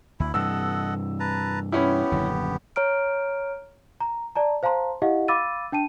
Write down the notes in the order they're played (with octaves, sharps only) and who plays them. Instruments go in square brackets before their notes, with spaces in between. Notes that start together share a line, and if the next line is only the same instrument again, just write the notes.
[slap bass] D2 [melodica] E4
[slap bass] G2 C3 E3 [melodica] A4 D#5 F#5 [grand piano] E6
[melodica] B4 A5 A#5
[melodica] B3 G4 [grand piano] C#4 E4
[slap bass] D#1 F#2 D3
[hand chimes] C#5 A#5 F6 D7
[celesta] A#5
D5 A5 A#5
C5 F5 A5 A#5 C6
E4 G4 D#5 F5 F#5
F5 B5 D6 E6 A6 D#7
D4 G5 A5 D#7